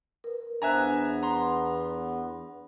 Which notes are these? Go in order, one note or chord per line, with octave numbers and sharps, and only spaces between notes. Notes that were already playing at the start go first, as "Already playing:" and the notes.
A#4 B4
E2 B3 D4 C5 E5 G#5 A#5 F#6
A#5 C6